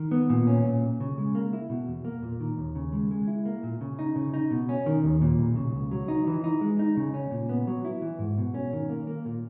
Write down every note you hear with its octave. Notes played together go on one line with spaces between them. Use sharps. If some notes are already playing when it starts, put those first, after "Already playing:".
Already playing: D#3
B3
A#2
C#4
A#2
B1
C#3
G#3
A#3
E4
B2
E2
A#3
A#2
D#3
D#2
C#3
G#3
G#3
E4
A#3
A#2
C#3
D#4
C#3
D#4
B2
C#4
D#3
D#2
A#2
B1
C#3
C#2
F#3
D#4
E3
D#4
G#3
D#4
C#3
C#4
A#2
B3
F#3
E4
E3
G#2
B2
C#4
D#3
A#3
A#3
A#2